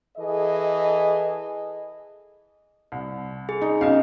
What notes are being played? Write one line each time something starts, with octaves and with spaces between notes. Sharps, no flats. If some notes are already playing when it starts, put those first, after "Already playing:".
E3 G#4 A4 D#5
C2
G#4
D#4
B1 C#4 D#5 F5